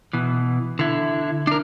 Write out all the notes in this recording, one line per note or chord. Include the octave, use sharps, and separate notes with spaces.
B2 E3
D3 E4
D4 A#4